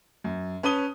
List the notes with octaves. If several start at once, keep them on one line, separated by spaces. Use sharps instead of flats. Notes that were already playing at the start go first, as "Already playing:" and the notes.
F#2
C#4 B4 A5 D#6 D#7 G7